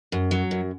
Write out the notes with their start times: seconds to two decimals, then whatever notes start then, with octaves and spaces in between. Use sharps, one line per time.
0.12 F#2
0.31 F#3
0.51 F#2